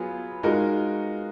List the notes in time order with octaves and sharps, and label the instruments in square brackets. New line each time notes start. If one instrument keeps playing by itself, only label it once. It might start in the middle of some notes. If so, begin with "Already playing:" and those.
Already playing: [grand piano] F#3 B3 F4 G#4
[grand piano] G#3 D#4 F#4 A#4 [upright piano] F4